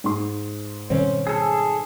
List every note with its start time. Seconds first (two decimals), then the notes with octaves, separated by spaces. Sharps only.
0.04 G#2 C6
0.90 B2 D#3 G3 C4 C#4
1.27 G#4 A4